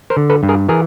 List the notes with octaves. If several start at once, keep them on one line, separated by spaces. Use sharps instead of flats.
A#4 C5
D3
A4 B4
G2
G#4 A#4
E3 G#4 A#4